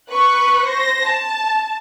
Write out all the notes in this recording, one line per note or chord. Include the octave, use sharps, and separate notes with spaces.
B4 C#6 F#6
C5 A#6
A5